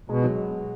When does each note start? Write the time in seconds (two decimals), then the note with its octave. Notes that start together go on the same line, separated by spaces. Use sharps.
0.09 B2 G#3
0.23 F#3